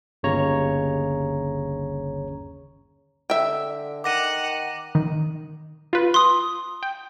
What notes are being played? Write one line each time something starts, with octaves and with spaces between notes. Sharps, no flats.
G1 D#2 C#3 C#5 A#5
D3 E5 G5
D#3 F#5 D6 A#6 D#7
D#3
F4 B4
C6 D#6
G5